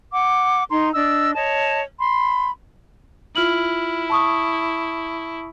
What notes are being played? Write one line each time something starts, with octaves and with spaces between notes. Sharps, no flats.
F#5 D6
D#4 A#5 C6
D4 D#5 E6
C#5 D#5 A5
B5 C6
E4 F4 F6 F#7
A5 C#6 D#6